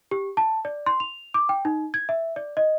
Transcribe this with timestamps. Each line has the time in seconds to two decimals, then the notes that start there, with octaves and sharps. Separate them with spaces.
0.11 G4
0.37 A5
0.65 D5
0.86 C6
1.00 F7
1.34 D6
1.49 G5
1.65 D#4
1.94 G#6
2.09 E5
2.36 D5
2.57 D#5